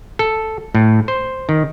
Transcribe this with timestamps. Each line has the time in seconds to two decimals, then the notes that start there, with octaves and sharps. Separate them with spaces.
0.19 A4
0.75 A2
1.08 C5
1.49 D#3